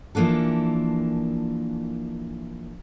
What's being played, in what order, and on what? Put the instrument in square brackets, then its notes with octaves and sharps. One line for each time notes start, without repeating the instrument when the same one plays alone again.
[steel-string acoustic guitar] E3 F3 A#3 D4 A4